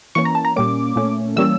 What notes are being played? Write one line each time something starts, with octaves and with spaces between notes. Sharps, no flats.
E3 A#3 C#4 C#6
A#5
A5
A#5
A#2 G3 A#3 C#4 D6
A#2 A3 C#4
E3 G3 A#3 C#4 E6